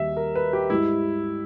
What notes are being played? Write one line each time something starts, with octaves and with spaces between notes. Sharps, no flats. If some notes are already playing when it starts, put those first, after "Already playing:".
Already playing: D#2 D#3 G3 E5
A#4
B4
G4
G#2 G3 E4